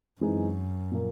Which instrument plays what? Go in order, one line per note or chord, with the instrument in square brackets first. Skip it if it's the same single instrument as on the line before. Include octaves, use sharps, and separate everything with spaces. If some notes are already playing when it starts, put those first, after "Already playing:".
[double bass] F#2 [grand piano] E3 G#3 C4 D#4 G#4
[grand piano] A#2 F3 A#3